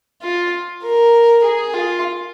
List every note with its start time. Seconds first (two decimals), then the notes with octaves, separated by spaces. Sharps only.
0.22 F4
0.83 A#4
1.43 G#4
1.74 F4